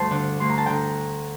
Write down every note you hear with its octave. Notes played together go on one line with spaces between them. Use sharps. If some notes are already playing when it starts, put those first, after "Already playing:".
Already playing: D2 G2 C5 G5 A5 C6
D3
D2 C6
A#5
A5
D3 G5 A#5